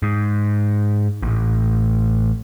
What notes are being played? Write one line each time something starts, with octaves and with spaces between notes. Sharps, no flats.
G#2
A1